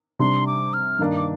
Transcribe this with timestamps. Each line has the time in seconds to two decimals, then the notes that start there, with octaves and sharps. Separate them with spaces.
0.19 C3 G3 D4 C6
0.47 D6
0.74 F6
0.99 G2 D#3 A#3 D4
1.17 D6